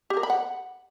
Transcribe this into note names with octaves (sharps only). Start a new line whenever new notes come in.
G4
A#4
B5
F#5